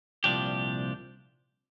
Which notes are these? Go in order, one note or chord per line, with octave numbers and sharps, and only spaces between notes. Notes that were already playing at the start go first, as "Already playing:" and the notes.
C2 A#2 F3 D4 G4